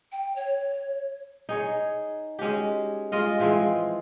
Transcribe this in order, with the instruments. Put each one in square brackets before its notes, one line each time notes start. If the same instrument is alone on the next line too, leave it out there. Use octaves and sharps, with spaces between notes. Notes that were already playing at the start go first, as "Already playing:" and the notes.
[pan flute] G5
C#5
[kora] D#4 G#4 C#5
G#3 C#4 F#4 G4
G#3 F4 D#5 F5
E3 F3 G#3 C4